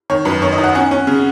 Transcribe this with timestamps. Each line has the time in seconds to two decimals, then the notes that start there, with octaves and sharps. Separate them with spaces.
0.10 D#3 C#5
0.25 F#2 B4
0.42 D#3 C#5
0.52 D#5
0.58 D#4
0.64 F#5
0.75 C#4 F#5
0.91 C#4
1.07 C#3